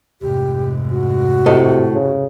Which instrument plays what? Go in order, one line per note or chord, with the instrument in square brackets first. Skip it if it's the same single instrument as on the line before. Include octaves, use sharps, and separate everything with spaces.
[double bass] F1 G#2 [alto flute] G4
[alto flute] F#4
[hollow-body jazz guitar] A2 A4 D#5 [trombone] C3
[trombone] C#3